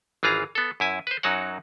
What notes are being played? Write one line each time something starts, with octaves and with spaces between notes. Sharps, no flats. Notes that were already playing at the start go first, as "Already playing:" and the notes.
G#1 E3 F4 G#4 A#5
B3 A4
F#2 E4 G#5
B4 C5
F#2 F#3 D#4 F#4 C#5 F#5